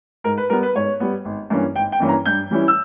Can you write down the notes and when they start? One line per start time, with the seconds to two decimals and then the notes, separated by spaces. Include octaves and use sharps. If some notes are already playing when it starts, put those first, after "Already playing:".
0.24 G#2 A#4
0.38 B4
0.50 G3 B3 A#4
0.63 B4
0.75 G#2 C#5
1.00 G3 B3
1.25 G#1
1.50 G2 E3 A#3 C#4
1.75 G#1 G5
1.92 G5
2.00 G2 E3 A#3 C#4
2.09 A#5
2.26 G2 G6
2.51 E3 G3 C#4 E4
2.68 E6